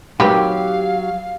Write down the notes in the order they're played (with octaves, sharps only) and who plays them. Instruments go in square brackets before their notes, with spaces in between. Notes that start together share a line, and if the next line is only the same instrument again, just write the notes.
[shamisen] D#3 C4 B4 [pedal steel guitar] F#3 [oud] G4 [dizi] F5